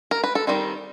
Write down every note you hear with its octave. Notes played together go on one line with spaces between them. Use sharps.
A#4
B4
A4
D#3 G3 C4 D#4